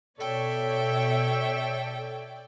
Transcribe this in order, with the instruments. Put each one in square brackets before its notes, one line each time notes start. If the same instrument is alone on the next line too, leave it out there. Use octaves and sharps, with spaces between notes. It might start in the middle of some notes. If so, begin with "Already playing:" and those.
[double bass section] B2 [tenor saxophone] A4 [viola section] C#5 E5 [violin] D5 G5